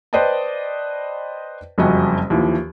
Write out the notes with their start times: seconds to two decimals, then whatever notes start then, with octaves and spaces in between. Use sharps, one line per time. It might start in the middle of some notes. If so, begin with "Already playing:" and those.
0.13 B4 C5 D5 D#5 G5 A5
1.78 F#1 F2 G3 F#4 D#5 G#5
2.30 D#2 E3 F3